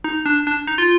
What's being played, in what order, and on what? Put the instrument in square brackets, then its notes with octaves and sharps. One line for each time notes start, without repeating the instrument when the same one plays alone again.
[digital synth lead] D#4
D4
D4
D#4
F4